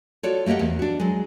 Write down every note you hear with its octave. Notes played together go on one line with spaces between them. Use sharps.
F4 F#4 A4 C#5 D5
A3 A#3 G4 D#5 F#5
E2
D4 F#4
F#3 G#3